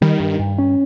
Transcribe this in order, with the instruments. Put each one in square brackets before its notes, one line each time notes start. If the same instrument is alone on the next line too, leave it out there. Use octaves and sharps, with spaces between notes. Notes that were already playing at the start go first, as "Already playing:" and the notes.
[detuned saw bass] D#3 [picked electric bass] G3
[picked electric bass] G2
G2
C#4